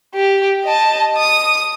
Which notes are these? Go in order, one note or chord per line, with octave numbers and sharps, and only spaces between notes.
G4
D#5 A5
D#6